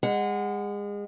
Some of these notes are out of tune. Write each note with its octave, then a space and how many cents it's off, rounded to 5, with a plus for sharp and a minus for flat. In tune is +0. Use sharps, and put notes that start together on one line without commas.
G#3 -30 F#5 +0